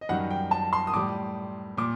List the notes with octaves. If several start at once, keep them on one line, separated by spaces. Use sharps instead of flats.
D#5
F#2 D#3 G3 F#5
G5
A5
C6
D#6
A2 G3 D6
A#2 D6